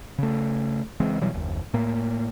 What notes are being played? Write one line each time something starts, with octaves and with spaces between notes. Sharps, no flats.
C#3 A3
C#3 E3 G#3 C4
B2 E3 F#3 G3
F#1 D#2
A2 A#3